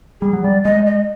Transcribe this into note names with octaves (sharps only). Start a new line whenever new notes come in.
G3 G#4
F#3
G3 D5
G#3 D#5
D#5